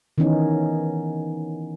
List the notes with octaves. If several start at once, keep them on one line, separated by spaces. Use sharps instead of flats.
D#3 E3 B3 C#4 D#4